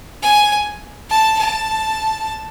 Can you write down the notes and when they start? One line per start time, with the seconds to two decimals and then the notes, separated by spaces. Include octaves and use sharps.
0.23 G#5
1.10 A5
1.38 A5